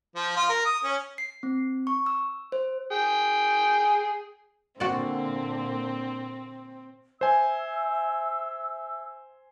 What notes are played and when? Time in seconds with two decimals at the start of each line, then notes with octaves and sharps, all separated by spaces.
0.16 F3
0.36 F4
0.49 A#4
0.65 D#6
0.84 C#4
1.18 C7
1.43 C4
1.87 C#6
2.06 E6
2.52 C5
2.91 G#4 G5
4.80 A#2 D3 C4 F#4 D5
7.21 C5 E5 G#5 E6